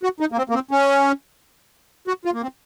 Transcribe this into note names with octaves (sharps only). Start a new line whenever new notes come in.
F#4
D#4
A#3
C4
A#3
C4
C#4
F#4
F4
A#3
C4